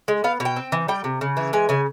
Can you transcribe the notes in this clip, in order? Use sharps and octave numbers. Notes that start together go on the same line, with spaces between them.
G#3
B3 F5
B2
G5
C4
E3
G3 G5
C3
C#3
E3
G#3 G#5
C#3 G#5